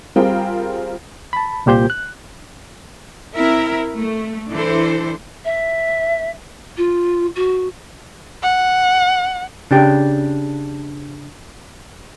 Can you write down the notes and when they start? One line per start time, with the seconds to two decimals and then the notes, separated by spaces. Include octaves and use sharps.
0.16 G3 C4 F4 G#4 A#4 G5
1.33 A5 B5
1.66 C2 A#2 G4 C5 G6
1.90 F#6
3.35 C4 E4 A#4 E5
3.98 A3
4.51 E3 D4 E4 A4 C5
5.44 E5
6.76 F4
7.35 F#4
8.42 F#5
9.71 C#3 D4 G4